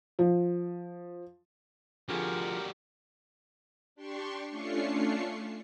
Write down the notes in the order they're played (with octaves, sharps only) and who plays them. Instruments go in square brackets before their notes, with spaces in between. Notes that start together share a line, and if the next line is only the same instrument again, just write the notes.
[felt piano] F3
[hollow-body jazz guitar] F2 D3 G#4 [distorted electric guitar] G3 F#4 [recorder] F4 [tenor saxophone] A#4
[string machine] D4 G4 C6 C#6
A3 C#4 D4 F4 C#6 C7